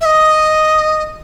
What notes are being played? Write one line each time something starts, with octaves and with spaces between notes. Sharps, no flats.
E5
D#5